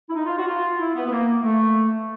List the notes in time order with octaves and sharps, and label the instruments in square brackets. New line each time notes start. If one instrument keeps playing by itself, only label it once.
[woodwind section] E4
D#4
F4
F#4
F4
E4
B3
B3
A#3
A3